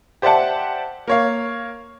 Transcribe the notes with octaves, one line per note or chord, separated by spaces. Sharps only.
G4 C5 D5 E5 F#5 A5
A#3 C#5 F5